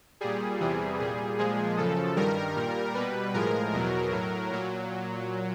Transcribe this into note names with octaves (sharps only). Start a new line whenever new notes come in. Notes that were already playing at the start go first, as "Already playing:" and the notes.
A#2 G3 G#4
E2 C3 E3 G3 G#4
A#2 G3 G#4
A#2 F3 G#3 G#4
F#2 C#3 F3 A4
G2 D#3 G3 A#4
A#2 G3
B2 G3 B4
A2 F3 G#3 A#4
E2 B2 F#3
A2 F#3
A#2 F#3